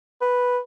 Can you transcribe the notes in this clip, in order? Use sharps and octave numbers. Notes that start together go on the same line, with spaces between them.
B4